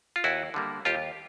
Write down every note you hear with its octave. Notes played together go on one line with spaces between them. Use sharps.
F4
D#2 E4 F#4
D3 G3 A#3
D#2 F4 G4